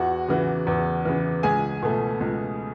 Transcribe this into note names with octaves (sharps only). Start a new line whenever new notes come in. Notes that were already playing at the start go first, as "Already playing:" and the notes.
Already playing: E2 F#4 F#5
C#3 E3
E2
C#3 E3
C#2 G#4 G#5
B2 A3
C#2